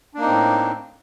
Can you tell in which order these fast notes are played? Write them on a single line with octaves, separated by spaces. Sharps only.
D4 A#3 D#4 C4 A2